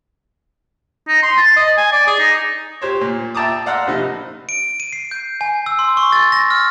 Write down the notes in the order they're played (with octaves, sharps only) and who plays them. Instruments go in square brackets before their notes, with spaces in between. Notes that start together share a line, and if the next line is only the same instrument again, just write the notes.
[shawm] D#4
C6
A5
D#5
G#5
D5
G#4
D#4
[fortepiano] G4 C5 C#5
A#2
E5 G5 A5 A#5 D6 D#6
D5 F5 F#5 A#5 C6 E6
A#1 C3 D#4
[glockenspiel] D7
D#7
C7
G6
G#5
E6
C6
C#6
A6
A#6
F6